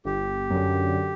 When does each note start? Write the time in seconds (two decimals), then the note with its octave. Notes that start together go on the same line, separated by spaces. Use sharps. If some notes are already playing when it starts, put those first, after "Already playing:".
0.05 G1 G4
0.51 F#2 D3